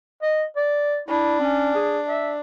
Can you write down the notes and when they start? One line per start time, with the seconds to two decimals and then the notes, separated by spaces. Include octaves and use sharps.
0.22 D#5
0.57 D5
1.08 D4 E4
1.40 C#4
1.75 G#4
2.09 E5